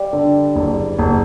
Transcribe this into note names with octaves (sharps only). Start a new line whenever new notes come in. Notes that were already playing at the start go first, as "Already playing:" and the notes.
Already playing: G3
D3
F#1
F#1